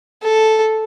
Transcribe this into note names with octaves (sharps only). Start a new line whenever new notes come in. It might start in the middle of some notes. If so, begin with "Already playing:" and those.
A4